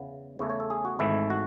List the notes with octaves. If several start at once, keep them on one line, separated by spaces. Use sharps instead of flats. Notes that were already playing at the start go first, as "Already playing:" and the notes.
Already playing: E2 C#3 E3 B3 B4
E2 C#3 E3 A3 C#5
C#5
A4
G#4
F#4
G#1 G#2 E3 A3 E4
F#4